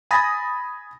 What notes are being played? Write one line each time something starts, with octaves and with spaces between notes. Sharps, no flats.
G#5 B5 D#6 A6 A#6